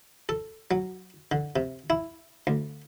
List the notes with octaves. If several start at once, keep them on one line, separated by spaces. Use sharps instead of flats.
A4
F#3
D3
C3
E4
D2